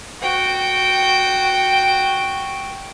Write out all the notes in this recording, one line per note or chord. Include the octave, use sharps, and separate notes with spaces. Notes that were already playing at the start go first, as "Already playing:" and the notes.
F#4 G5